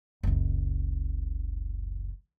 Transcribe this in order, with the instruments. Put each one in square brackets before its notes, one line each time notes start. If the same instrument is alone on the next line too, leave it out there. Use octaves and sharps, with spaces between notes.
[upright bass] F#1 C#2